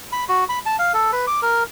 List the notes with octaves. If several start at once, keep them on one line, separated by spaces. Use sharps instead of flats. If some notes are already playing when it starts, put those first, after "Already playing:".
B5
F#4
B5
A5
F5
A4
B4
D6
A#4